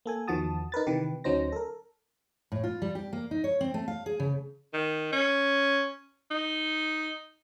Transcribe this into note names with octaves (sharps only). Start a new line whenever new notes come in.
A#3 A4 G#5
E2 D#3 F3 F#4 A5 D#6
D#4 A#4 B4 A6
C3 D#3 E3 G4 B4
D2 F#3 C#4 D#4 C5 A#6
A4 A#4
A2
F4
G3
G4
A#3
D#4
C#5
C4
A3
F5
G#4
C#3
D#3
C#4
D#4